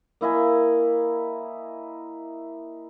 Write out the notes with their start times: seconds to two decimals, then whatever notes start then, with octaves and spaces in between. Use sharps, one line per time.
0.21 A#3 E4 D#5 G#5